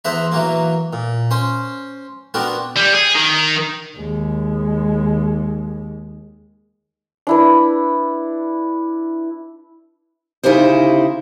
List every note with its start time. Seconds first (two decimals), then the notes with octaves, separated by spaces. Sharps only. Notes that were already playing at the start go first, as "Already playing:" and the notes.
0.05 E2 C5 E5 F#5 A#5
0.32 E3 F#3 A#3
0.93 A#2
1.31 C#4 C5
2.34 B3 C4 D4 F#4 A#4
2.77 G3
2.94 G#4
3.15 D#3
3.98 D#2 G#3
7.27 D4 E4 B4
10.43 D2 C#3 D#4 E4 G4 C5